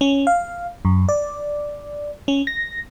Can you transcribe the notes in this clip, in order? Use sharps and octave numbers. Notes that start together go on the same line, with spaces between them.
C#4
F5
F#2
D5
C#4
A#6